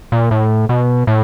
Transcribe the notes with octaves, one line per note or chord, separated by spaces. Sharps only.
A#2
A2
B2
A2